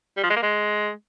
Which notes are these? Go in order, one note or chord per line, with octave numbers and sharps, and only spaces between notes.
G3
F3
G#3
A#3
G#3